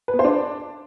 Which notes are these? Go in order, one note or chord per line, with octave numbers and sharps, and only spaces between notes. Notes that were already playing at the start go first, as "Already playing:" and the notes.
B4
B3
C5
D4